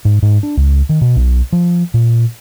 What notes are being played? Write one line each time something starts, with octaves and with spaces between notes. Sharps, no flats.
G#2
G#2
D4
C#2
D#3
B2
B1
F3
A#2